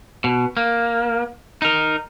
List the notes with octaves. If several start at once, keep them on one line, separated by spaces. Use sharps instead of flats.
B2
A#3
D#4 A#4